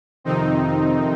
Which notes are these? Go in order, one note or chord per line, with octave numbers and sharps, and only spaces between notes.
F2 C3 D#3 C4 D#4